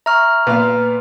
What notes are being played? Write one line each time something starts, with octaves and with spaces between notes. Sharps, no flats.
E5 A#5 C#6 F6
A#2 B3 B4 F5